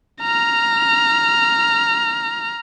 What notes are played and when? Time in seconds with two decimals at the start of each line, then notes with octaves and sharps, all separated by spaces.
0.22 A#5 F6